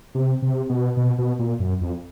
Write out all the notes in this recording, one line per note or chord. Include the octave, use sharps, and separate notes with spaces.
C3
C3
B2
B2
B2
A#2
F#2
F2